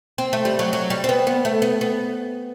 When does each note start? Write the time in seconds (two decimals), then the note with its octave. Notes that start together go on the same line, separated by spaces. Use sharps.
0.18 C4
0.33 A3
0.45 G3
0.59 F#3
0.73 F#3
0.90 G3
1.04 C4
1.09 B3
1.27 B3
1.45 A3
1.62 B3
1.81 B3